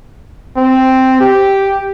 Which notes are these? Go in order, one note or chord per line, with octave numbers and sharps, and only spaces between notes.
C4
G4